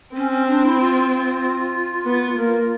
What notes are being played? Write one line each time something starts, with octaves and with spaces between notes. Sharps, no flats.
C4 C#4
C#4
D4
E4
F4
B3
A#3